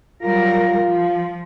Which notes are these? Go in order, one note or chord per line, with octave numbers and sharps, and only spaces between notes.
F#3 G3 F4 A#4
F3